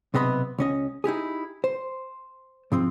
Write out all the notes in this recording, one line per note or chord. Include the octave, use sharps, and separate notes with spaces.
B1 C3 B3 D#5 B5
C#2 C#4 D#5
D#4 E4 G4 G#4
C5
G#2 F3 C4